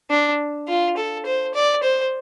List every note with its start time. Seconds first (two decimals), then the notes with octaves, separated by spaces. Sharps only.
0.10 D4
0.68 F4
0.97 A4
1.26 C5
1.55 D5
1.83 C5